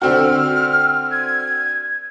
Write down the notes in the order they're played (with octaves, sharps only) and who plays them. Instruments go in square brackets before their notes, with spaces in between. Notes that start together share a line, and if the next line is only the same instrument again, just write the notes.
[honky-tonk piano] D3 C4 F#4 [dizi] F6
[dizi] G#6